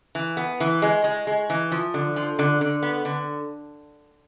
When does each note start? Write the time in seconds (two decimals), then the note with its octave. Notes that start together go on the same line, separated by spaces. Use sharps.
0.15 E3
0.37 B3
0.60 E3
0.82 G#3
1.04 G#3
1.27 G#3
1.50 E3
1.72 F3
1.94 D3
2.16 F3
2.39 D3
2.61 D3
2.83 B3
3.05 D3